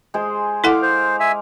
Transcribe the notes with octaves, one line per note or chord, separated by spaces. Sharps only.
G#3 G#4 C5
E4 A4 F5 F#5 C6 D6
C5
E5 G#5